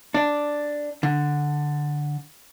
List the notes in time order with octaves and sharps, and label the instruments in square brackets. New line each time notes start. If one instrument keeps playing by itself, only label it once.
[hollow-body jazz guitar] D4
D3